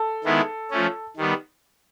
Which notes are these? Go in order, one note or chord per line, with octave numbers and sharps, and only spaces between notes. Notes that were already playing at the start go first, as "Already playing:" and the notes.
Already playing: A4
D#3 G#3 B3 E4
F3 A3 C#4
D#3 G3 B3